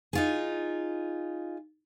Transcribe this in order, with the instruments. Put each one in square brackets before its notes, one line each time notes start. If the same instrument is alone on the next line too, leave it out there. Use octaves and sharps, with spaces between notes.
[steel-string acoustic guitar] D#4 F4 G#4